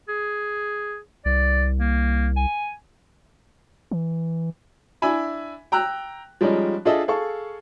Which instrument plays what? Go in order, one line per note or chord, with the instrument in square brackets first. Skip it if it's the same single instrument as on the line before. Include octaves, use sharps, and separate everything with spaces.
[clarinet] G#4
[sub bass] C2 [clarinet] D5
[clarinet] A#3
G#5
[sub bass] E3
[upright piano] D4 E4 E5 G#5 B5
G5 A#5 E6 F#6
F3 G3 G#3 C#4 D#4
D4 F4 G#4 A4 D#5 E5
G#4 A4 F5 C#6